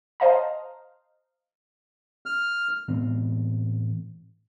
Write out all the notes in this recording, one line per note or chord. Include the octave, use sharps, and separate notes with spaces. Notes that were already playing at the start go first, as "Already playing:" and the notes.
C5 D#5 F5 A5 A#5
F6
A2 E3 B3 C4